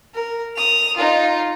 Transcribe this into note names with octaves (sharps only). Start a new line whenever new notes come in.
A#4
D#6 F7
D#4 F4